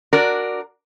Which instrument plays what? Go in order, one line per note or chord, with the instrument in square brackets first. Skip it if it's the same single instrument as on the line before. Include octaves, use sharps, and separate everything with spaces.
[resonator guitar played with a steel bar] D4 F#4 A#4 D5